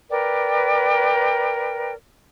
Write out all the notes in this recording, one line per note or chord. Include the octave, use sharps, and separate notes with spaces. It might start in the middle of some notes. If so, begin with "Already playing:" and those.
A#4 B4 D5 G5